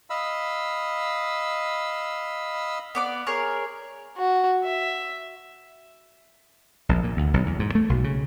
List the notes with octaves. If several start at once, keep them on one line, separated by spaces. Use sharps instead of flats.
D#5 F5 B5 E6
B3 D5 D6
G#4 A#4 C#5
F#4
E5
A#1
A#2
D2
B1
E2
G#2
A3
B1
C#3